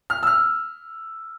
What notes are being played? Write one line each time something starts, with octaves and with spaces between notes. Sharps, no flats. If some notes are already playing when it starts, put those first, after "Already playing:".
F6
E6
F6